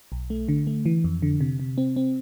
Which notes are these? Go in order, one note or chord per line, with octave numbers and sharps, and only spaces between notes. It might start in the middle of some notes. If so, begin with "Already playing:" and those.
B1
A3
D3
A3
E3
F2
D3
C3
C3
C4
C4